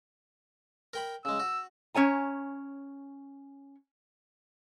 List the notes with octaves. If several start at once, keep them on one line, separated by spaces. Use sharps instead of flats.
A#4 G5 B5
C#3 G#3 E6
F#4
C#4 C#5 G#5 A#5